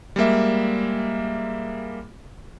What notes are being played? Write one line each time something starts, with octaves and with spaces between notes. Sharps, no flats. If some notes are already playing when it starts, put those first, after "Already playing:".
G3 G#3 A#3 E5